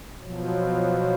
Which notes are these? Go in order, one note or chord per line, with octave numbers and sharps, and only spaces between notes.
B2 F3 F#3